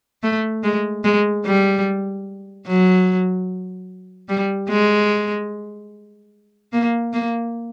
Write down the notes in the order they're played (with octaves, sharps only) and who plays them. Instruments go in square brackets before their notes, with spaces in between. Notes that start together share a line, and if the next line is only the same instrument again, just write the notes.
[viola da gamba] A3
G#3
G#3
G3
F#3
G3
G#3
A#3
A#3